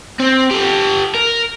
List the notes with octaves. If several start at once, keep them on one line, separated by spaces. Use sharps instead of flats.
C4
G4 A4
A#4